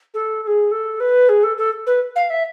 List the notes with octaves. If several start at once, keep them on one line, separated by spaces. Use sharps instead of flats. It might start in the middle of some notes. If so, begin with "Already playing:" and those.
A4
A4
G#4
A4
B4
G#4
A4
A4
B4
F5
E5